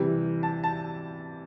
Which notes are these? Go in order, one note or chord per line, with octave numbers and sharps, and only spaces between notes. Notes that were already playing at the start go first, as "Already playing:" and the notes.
Already playing: C3 E3 G3
A5
A5